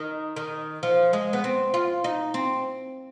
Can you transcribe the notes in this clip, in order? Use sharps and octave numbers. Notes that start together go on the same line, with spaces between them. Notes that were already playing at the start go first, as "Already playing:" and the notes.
Already playing: D#3
D#3
F3
G#3
B3
C4
F4
D#4
C4